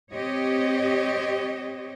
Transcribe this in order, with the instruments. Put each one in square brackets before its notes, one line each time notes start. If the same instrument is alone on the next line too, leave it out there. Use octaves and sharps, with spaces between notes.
[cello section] C4 G4 C#5 D#5